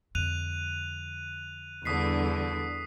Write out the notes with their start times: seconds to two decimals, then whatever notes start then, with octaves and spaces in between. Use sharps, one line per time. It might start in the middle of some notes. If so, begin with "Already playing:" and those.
0.15 F2 D3 F#6 D#7 F7
1.85 E2 D3 G3 D#6 B6 C7